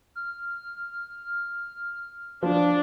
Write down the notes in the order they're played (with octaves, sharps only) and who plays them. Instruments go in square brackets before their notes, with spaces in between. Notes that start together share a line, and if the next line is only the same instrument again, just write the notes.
[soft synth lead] F6
[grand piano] F3 [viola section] D4